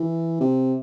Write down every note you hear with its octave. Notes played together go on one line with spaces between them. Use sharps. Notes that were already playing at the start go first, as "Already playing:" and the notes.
Already playing: E3
C3